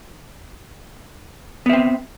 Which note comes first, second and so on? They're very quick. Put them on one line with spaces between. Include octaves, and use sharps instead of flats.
B3 E5 C4